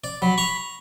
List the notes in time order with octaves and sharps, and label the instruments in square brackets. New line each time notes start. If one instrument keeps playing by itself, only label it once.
[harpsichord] D5
[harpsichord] F#3 [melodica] B5
[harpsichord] A#5 C#6